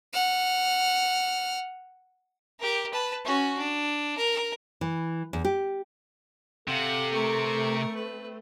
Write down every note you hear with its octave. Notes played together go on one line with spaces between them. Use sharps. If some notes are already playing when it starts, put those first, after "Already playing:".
F#5 F6
G4 A#4
B4 A5
C#4 F#4
D4
A#4
E3
E2
G4
C3 A4 F5 F#5
A3 C4 A#4 C#6
B4